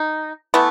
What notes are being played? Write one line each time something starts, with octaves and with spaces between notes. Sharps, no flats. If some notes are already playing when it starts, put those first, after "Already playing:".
Already playing: D#4
E3 A3 B3